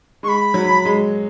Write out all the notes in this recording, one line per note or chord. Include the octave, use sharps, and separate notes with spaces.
G#3 C#6
B5
F#3
G#3